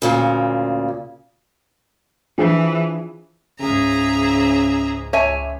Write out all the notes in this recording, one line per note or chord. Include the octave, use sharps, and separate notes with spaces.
D2 A#2 C#3
E3 F3 D4 G#4
C#2 G#2 C#3 G#4 E5 A#5
C#2 C#5 E5 G#5